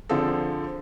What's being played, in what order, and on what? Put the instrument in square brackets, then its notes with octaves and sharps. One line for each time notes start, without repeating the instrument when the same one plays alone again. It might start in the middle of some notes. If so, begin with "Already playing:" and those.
[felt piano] D3 F3 C4 G#4 A4